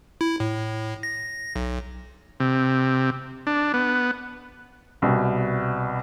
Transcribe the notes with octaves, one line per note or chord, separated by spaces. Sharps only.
E4
A2
A#6
B1
C3
D4
B3
C2 B2